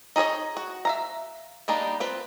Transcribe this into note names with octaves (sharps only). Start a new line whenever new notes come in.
D#4 G#4 A4 C#5 D#5
F#4
E5 F5 A#5
G3 A#3 D4 D#4
C4 F4 B4